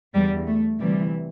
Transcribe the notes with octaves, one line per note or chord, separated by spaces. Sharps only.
E2 D3 G3
A3
D2 C3 E3 G3